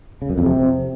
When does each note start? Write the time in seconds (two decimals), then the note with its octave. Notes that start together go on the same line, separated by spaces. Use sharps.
0.22 C#3
0.30 F#2
0.38 F2
0.46 C3